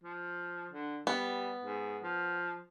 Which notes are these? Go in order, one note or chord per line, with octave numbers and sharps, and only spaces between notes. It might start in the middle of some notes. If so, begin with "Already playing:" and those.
F3
D3
G3 B3
G#2
F3